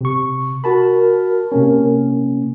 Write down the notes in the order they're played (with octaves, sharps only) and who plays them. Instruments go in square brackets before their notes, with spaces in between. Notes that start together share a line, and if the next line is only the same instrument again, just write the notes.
[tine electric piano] C3 C#6
[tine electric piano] F#4 A5 B5 [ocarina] A#4
[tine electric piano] C3 A#3 C#4